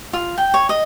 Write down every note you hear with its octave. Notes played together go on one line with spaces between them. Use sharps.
F4
G5
C#5
D#5